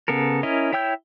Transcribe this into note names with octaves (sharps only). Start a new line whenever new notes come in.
C#3 B3 A4 A#4
C#4 E4 A#4 D#5
E4 C#5 G5 E6 G6